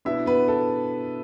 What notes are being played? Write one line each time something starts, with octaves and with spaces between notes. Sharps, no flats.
B2 B3 D4 E4 E5
B3 B4
A4